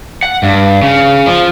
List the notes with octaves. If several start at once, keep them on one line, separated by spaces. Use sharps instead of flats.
F#5
G2
C#3
F3